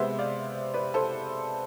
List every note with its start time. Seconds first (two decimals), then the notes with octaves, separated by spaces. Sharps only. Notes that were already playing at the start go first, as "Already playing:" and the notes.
Already playing: C3 G#3 B3 C5 E5
0.19 D5 F5
0.74 B4 D5
0.94 A4 C5